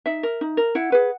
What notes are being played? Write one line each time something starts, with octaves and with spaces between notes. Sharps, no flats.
D#4 E5
A#4
D#4
A#4
E4 F#5
G#4 B4